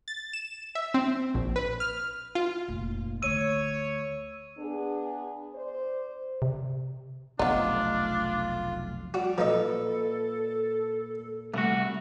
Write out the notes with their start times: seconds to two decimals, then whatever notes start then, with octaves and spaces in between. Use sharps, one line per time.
0.08 A6
0.33 E7
0.75 E5
0.94 C4
1.34 A#1
1.56 B4
1.80 F6
2.35 F4
2.68 F1 A#2
3.22 D2 C#5 E6 D#7
4.58 B3 D4 G#4
5.55 C5 D5
6.42 C3
7.39 F1 B1 A3 B3 D4 D#4 F4
9.14 F3 G3 F#4
9.38 A#2 F3 D#4 A4 B4 D#5
11.54 C2 E3 A3 F#4